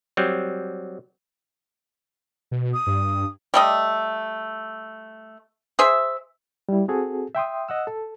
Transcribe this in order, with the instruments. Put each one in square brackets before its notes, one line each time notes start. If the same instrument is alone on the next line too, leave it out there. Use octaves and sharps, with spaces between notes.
[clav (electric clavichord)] F#3 G3 C4
[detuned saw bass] B2
[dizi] D#6
[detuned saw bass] G2
[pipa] G3 A3 D#5
G#4 C5 E5
[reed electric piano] G3 E4
C4 F#4 G#4 A4
E5 G5 C6 D#6
D#5 F#5 E6
A4